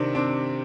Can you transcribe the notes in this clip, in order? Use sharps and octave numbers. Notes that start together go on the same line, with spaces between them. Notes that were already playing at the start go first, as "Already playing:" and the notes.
Already playing: C3 D#3 C4 D4
C4 D4